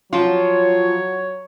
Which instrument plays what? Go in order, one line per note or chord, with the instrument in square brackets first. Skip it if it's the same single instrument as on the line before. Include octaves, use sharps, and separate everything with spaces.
[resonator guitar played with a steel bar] F3 F4 [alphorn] F#3 [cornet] C#5